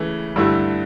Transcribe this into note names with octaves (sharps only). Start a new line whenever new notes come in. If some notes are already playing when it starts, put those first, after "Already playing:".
Already playing: C#3 E3 A3
G2 D3 A3 E4